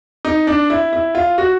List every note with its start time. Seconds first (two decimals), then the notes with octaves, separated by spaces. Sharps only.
0.25 D#4
0.47 D4
0.70 E4
0.93 E4
1.15 F4
1.38 F#4